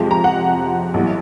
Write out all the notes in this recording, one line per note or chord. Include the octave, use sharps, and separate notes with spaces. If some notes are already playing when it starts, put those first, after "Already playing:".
Already playing: F2 C3 F3 G#3
A#5
F#5
B1 A2 E3 G3